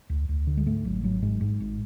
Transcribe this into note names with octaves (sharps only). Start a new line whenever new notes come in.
D2
D2
D3
G#3
G#2 A3
G#1 F#3
G#1 F#3
G#2 G#3
G#2
G#1